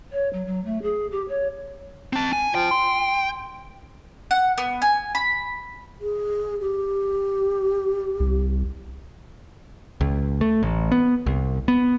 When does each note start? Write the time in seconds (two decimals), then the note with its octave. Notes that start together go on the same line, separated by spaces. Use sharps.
0.12 C#5
0.33 F#3
0.46 F#3
0.65 A3
0.82 G#4
1.11 G4
1.28 C#5
2.13 C4 A5
2.33 G#5
2.55 F3 G5
2.71 C6
4.31 F#5
4.58 B3
4.82 G#5
5.15 B5
5.99 G#4
6.60 G4
8.20 C2
10.01 C#2
10.41 A3
10.63 A1
10.92 B3
11.26 C2
11.68 B3